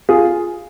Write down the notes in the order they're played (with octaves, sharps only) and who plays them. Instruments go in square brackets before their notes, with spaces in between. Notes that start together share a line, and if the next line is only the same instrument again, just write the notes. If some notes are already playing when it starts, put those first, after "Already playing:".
[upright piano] F4 G#4